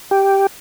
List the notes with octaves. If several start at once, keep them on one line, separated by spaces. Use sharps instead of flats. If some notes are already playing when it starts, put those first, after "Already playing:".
G4